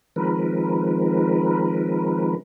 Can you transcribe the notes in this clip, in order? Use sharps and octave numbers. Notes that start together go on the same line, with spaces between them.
D#3 F3 G#3 C4 A#4 B4